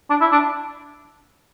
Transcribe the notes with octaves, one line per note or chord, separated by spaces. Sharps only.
D4
E4
D4